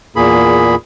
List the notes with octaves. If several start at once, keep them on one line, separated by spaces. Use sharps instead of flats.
E2 A#2 A#3 G#4 B5